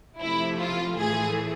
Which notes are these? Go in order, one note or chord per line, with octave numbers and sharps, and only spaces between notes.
C3 F3 A3 E4
F4
A2 E3 A3 G#4